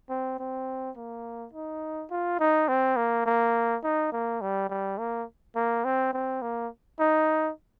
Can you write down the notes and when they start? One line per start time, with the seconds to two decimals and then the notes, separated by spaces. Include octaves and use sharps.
0.10 C4
0.39 C4
0.96 A#3
1.53 D#4
2.11 F4
2.39 D#4
2.68 C4
2.96 A#3
3.26 A#3
3.83 D#4
4.12 A#3
4.41 G3
4.69 G3
4.98 A#3
5.56 A#3
5.85 C4
6.13 C4
6.42 A#3
6.99 D#4